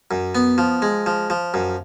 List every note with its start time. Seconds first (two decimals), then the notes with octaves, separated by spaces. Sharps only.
0.11 F#2
0.35 B3
0.58 F3
0.82 G#3
1.06 F3
1.30 F3
1.54 F#2